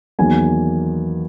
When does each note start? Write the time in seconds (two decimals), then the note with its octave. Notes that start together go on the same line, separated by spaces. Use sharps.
0.19 E2 D#3 F#3 A#3 G#5